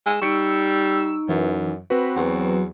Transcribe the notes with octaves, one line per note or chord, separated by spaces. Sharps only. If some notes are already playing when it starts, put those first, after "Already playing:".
G#3 E6
G3 D#4 C#6 C#7 D7
F#2 E3
C4 F#4 B4
E2 F#3 B4